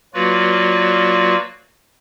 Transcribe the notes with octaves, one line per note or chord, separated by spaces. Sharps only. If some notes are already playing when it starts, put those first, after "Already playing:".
F#3 A#3 F4 F#4 B4 D5